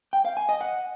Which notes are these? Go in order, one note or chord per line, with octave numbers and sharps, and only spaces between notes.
G5
F5
G#5
D#5
F#5